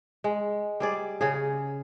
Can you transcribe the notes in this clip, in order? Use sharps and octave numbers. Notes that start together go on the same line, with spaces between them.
G#3
G3 G#4 D5
C#3 G#4